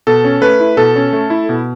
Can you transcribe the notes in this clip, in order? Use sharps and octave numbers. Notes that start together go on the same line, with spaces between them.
B2 A4
C#4
A3 B4
E4
B2 A4
C#4
A3
E4
B2